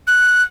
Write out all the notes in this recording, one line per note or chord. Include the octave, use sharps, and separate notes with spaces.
F#6